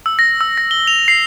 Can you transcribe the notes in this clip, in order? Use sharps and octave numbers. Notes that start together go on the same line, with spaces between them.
E6
A#6
E6
A#6
G7
F7
C7